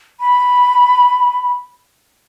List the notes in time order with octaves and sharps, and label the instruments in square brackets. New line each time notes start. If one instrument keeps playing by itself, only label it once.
[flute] B5